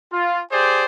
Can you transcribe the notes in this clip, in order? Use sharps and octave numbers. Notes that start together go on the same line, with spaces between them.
F4
G4 G#4 C5 D5